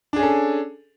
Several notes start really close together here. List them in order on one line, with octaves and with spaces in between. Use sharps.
D4 G#4 C#4 A4